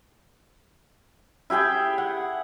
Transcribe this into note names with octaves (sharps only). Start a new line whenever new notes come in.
E4 G4 G#4 G5
F#5